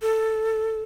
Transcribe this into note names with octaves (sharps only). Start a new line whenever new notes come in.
A4